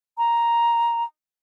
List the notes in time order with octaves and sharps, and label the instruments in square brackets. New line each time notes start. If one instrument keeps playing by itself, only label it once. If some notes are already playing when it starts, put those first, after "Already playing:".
[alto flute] A#5